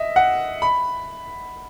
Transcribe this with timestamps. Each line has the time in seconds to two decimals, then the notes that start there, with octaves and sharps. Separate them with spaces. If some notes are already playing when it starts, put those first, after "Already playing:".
Already playing: D#5 E5
0.16 F#5
0.62 B5